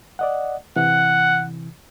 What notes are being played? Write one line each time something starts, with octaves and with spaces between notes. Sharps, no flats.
D5 D#5 F#5
C3 E3 F#5